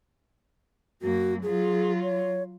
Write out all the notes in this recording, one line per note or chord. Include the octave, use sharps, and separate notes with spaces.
F#2 A#3 F#4
F#3 F4 G#4
C#5